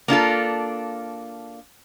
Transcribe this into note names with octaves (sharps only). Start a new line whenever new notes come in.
A#3 D4 F4 A4